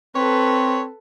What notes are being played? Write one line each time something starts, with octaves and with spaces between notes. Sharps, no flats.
C4 A4 B4 C#5